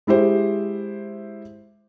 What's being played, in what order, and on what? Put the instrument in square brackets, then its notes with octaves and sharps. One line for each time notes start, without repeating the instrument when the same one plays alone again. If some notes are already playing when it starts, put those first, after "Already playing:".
[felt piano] G#3 E4 G4 C5